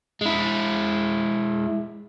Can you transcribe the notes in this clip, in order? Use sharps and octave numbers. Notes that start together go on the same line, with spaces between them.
G#3 E4